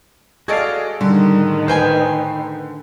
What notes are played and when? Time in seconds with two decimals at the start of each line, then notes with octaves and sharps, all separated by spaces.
0.48 F#4 G#4 A4 D5 D#5 F5 G#6
1.01 A2 D3 D#3 G3
1.68 B4 C5 G5 G#5